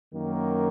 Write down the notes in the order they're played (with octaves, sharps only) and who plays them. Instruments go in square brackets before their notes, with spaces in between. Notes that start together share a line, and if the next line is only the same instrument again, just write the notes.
[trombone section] F#2 D#3 F#3 A#3